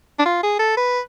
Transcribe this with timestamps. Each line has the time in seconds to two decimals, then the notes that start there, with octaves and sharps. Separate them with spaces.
0.19 D4
0.25 F4
0.43 G#4
0.59 A4
0.77 B4